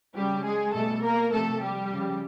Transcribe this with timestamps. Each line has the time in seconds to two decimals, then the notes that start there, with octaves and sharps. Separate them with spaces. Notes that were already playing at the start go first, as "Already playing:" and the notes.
0.15 C#3 F#3 G3 G4
0.44 G#3 G#4
0.74 B2 G3 A3 A4
1.02 A#3 A#4
1.32 C3 F3 A3 A4
1.62 G3 G4
1.91 C#3 F3